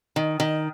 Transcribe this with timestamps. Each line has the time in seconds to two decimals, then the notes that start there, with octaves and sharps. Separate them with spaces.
0.16 D#3
0.40 D#3